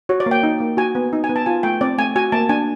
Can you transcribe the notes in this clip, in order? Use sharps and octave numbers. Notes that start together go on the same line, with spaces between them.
F#4 C#5
D5
A#3
G5
D#4
A#3
F#4 G#5
B3
D#4
G#5
B3
A5
F4 G#5
A3 G5
C4 D5
A3 G#5
F#4 G#5
A#3 A5
D4 G#5